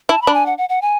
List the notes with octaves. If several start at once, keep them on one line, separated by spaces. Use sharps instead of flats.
E4 A5
B5
D4
G#5
F#5
F#5
F#5
G#5